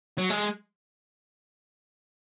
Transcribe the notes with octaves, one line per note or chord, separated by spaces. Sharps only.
F#3
G#3